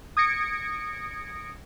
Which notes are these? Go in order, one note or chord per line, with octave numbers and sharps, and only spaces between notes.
D#6 G#6 A#6 C#7 D7